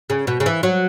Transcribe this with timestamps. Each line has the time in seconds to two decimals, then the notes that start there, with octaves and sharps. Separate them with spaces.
0.10 C#3
0.27 B2
0.40 C#3
0.46 E3
0.63 F#3